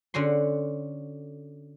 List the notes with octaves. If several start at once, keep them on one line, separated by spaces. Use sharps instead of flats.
D3 C#4 F#4 C6